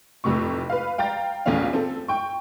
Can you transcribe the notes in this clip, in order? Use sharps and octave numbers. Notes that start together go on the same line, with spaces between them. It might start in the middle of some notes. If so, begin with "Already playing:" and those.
F1 F2 A2 C3 C#6
B4 F5
F5 G5 A#5 A6
A#1 E2 A3 C#4 F5
C4 A4
G5 C#6